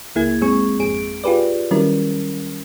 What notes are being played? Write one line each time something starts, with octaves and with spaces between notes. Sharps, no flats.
C#2 A#3 E4 G#4 G#6
F#2 G#3 C4 G#4 C#6
G#1 F2 G#4 D7
F4 G4 G#4 B4 D5
D#3 F#3 G3 C#4 E4 A#4